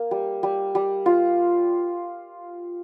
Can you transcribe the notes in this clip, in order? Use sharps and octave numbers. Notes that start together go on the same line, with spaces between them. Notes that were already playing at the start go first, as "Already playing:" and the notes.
Already playing: A#3
G3
G3
G3
F4